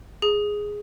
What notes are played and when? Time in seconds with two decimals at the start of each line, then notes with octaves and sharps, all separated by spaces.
0.22 G#4